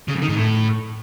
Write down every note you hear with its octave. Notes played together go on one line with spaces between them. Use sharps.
C#3
F2
D#3
G#2
A2